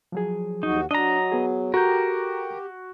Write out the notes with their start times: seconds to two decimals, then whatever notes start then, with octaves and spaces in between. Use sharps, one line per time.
0.12 F3 F#3 G#4
0.63 D#2 D#4 F#4
0.91 F#3 D4 D#5 A#5
1.32 B3 G#4
1.74 F#4 G4 A4 A#4 A#5 G6